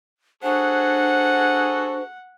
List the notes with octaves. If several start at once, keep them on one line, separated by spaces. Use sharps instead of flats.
D4 F#4 G#4 A4 C5 F#5